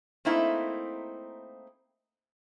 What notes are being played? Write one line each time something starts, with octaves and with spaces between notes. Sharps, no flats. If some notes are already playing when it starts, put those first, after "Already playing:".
A3 A#3 C4 D#4 E4